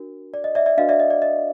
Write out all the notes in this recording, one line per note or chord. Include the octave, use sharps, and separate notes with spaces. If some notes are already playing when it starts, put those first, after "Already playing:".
Already playing: D4 F#4 A#4
D5
D#5
D5 E5
D5 E5
D4 F#4 B4 D5 D#5 F5
D5 E5
D#5
D5
D#5